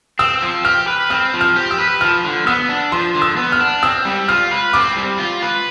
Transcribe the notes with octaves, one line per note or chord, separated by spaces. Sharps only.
C4 E6
F3
G4 F6
B4
C4 F6
F3
F6
G4
E6
B4
F3 F6
D3
B3 E6
D4
F3 C6
D3
E6
B3
F6
D4
C4 E6
G3
F4 F6
B4
C4 D6
G3
F4
B4